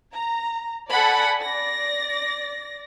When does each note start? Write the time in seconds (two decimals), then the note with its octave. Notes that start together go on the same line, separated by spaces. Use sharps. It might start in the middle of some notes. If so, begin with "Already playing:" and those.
0.13 A#5
0.90 A4 D5 F#5 G#5 B5
1.43 D5 A#6